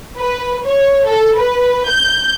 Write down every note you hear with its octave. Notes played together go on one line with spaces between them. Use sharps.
B4
C#5
A4
B4
G6